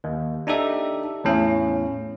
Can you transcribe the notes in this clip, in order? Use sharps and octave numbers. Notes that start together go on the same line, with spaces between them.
D#2
D4 D#4 G4 A4 E5
E2 A2 C#4